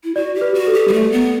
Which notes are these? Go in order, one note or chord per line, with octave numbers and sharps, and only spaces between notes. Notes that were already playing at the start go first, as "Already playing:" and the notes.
E4
F#4 D5
G4
B4
F#4
A4
G4
G3
A3
B3